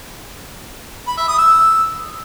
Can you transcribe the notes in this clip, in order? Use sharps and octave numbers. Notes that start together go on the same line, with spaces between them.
B5
E5
D#6
E6